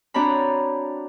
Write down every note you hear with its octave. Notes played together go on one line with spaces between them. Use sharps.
C4 D4 F#4 C#5 A#5 B5